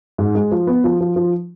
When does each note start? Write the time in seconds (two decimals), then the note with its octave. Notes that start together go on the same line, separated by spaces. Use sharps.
0.18 G#2
0.35 G#3
0.51 F3
0.67 B3
0.84 F3
1.01 F3
1.16 F3